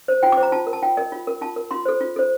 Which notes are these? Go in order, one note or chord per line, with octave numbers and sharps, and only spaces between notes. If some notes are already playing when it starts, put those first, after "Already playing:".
C5
F4 G5
D6
C5
A#5
F4 A5
A#4
A5
F4 G5
A#4 D#5
F4
A#4
F4 A5
A#4
F4 C6
A4 C5
F4
A4 C5